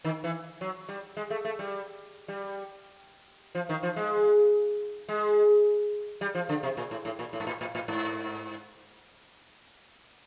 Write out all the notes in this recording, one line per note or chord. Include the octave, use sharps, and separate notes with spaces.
D#3
E3
F#3
G3
G#3
A3
A3
G3
G3
F3
D#3
F3
G#3
G#3
G3
F3
D3
C3
A#2
A2
A2
A#2
A2
G#2
A2
A2
A2
G#2